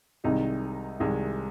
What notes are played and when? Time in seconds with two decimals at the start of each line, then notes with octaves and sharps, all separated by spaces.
0.24 C2 C3 D#3 G#3 D#4
1.00 C2 C3 D#3 G#3